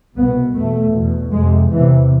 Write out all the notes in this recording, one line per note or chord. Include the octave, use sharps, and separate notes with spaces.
C2 B2 B3
E2 B2 A3
E2 B2
F2 C3 G#3
E2 C3 E3